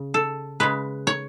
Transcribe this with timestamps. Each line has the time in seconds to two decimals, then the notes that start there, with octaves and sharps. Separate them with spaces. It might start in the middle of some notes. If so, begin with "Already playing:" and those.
Already playing: C#3
0.14 A4
0.60 C#3 G#3 B4
1.07 C#5